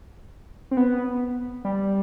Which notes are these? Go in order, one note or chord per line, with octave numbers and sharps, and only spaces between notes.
C4
B3
G3